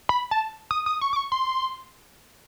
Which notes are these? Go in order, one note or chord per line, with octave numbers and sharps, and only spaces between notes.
B5
A5
D#6
D#6
C#6
D6
C#6
C6